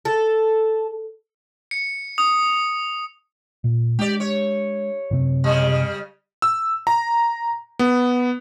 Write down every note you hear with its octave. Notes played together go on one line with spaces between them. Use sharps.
A4
C#7
D#6
A#2
G#3 D4 G4 D5
C#5
F#2 C3 C4
C#3 G3
E6
A#5
B3